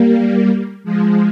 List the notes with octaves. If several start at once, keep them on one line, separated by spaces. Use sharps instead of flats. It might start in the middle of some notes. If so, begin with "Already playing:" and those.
Already playing: G3 A#3
F3 G#3